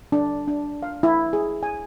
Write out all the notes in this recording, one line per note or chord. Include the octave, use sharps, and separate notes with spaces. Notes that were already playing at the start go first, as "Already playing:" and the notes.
D4
D4
F5
E4
G#4
G#5